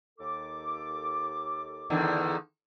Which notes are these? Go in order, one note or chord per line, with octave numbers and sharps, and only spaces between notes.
D#2 A4 D6
E2 D3 D#3